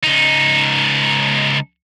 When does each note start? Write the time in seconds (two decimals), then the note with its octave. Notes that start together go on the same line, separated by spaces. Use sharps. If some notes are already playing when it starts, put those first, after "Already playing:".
0.03 C#2 D#4